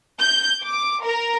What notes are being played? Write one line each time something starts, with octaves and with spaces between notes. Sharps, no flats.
G6
D6
A#4